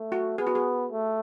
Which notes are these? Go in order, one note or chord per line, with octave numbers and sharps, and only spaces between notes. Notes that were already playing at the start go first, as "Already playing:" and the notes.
Already playing: A3
F#4
B3 G#4
F#4
G#4
A3